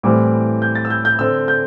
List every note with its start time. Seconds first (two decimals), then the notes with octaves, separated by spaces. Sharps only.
0.03 A2 E3 G3 C4 D6
0.62 G6
0.75 A6
0.85 E6
0.90 G6
1.05 G6
1.19 D3 C4 E6
1.48 G6